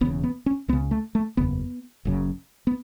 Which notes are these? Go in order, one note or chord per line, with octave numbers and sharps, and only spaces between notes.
E1 E2 C#3 B3
B3
C#4
C#2 C#3 B3
A3
A3
F#1 E2 C#3 B3
F#1 F#2 C#3
B3